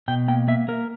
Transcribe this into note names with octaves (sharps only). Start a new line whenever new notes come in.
B2 G5
A#3 G5
A#3 E5
A#3 A#4